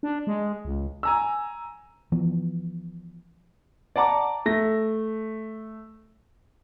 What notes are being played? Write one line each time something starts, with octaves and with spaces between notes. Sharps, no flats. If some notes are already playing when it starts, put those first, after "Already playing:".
D4
G#3
C#2
G#5 A#5 E6
E3 F3 B3
D5 F#5 A5 A#5 D6
A3 A#6